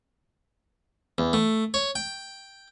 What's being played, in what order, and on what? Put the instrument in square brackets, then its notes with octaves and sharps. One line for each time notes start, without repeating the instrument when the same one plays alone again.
[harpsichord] E2
A3
C#5
G5